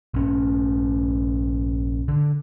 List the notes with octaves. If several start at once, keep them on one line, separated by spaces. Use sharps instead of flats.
A#1 C#4
D3